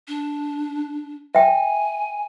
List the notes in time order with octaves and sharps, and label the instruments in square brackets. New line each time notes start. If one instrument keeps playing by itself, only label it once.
[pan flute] D4
[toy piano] E5 G5 [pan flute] G#5